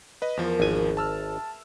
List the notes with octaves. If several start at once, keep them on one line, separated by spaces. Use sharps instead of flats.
B4 D#5
E2 F3 G#4 A#4 D6
G#1 D5 G#5
B4 D#5 E5 A5 E6 F6